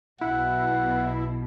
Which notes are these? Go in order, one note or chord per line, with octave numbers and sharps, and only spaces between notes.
B1 B2 E4 F#5